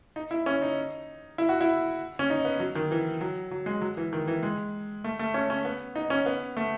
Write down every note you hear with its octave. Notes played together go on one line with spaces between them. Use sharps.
D#4
E4
C#4
D#4
E4
F#4
E4
C#4
D#4
B3
F#3
D#3
E3
F#3
F#3
G#3
F#3
E3
D#3
E3
G#3
A3
A3
C#4
C#4
B3
D#4
C#4
B3
A3